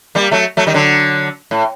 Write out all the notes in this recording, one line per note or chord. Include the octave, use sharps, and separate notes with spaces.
G3 A#3
F#3 A3
F#3 A3
D#3 G3
D3 F#3
A2